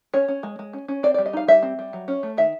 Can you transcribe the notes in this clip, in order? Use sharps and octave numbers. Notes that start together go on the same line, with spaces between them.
C#4 C#5
C#4
G#3
G#3
C#4
C#4
C4 D5
G3 D5
D#5
D#4 F5
G3 E5
C4
G3
F#3
C#4
A3
D#3 E5